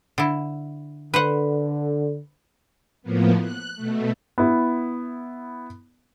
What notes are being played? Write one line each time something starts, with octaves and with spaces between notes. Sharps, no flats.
D3 E4
D3 B4 C5 F#5
A2 F3 A#3 B3
F#6
B2 A3
B3 E4